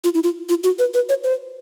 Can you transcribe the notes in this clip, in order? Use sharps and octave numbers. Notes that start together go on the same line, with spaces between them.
F4
E4
F4
F4
F#4
B4
B4
C#5
C5